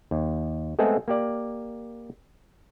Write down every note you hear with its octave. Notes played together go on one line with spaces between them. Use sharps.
D#2
G#3 A3 B3 C4 G#4 A4
A#3 G4 D5